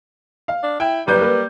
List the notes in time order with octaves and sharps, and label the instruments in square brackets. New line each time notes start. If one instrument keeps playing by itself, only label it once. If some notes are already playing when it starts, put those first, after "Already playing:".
[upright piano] F5
[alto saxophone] D4
[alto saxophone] E4 [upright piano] G5
[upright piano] F#1 B4 G6 [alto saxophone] G3
[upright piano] A#3 B4